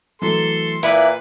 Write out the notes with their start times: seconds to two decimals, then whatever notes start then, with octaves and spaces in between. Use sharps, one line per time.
0.22 E3 F#3 A3 A4 C6
0.83 A#2 E4 B4 D5 E5 C#7